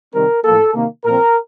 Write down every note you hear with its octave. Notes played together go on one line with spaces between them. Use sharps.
C3 D#3 G3 C4 A#4
A2 F3 A#3 A4
C3 D#3 A#3
A#2 F3 C4 A#4